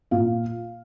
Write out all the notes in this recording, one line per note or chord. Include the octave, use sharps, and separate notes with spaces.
A#2 F5